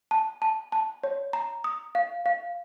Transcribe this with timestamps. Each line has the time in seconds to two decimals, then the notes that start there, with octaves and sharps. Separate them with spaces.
0.11 A5
0.42 A5
0.72 A5
1.04 C#5
1.33 A#5
1.64 D#6
1.95 F5
2.26 F5